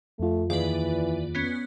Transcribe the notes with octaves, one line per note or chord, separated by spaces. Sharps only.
F2 A3 F4
D#2 E3 G#4 B4 D5 F5
B3 C#4